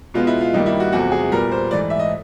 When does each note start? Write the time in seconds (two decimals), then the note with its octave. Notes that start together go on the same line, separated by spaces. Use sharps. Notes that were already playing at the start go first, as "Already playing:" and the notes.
0.14 B2 G#3 B3 F4
0.27 E4
0.41 F4
0.54 G2 D#3 G3 A#3 D#4
0.66 E4
0.80 F#4
0.92 E2 C3 F3 A3 F#4
1.12 G#4
1.32 A#2 G3 B3 A#4
1.51 C5
1.71 G#2 E3 A3 D5
1.90 E5
1.99 D#5